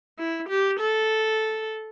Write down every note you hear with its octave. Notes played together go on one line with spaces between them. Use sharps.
E4
G4
A4